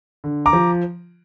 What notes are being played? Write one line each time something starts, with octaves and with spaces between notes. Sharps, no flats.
D3
A#5 D6
F3